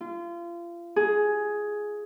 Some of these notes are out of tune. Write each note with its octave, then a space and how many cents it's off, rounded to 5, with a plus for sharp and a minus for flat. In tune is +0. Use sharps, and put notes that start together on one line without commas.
F4 -30
G#4 +10